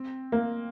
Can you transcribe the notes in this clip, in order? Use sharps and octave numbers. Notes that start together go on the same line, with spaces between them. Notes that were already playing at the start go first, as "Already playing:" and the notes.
Already playing: C4
A#3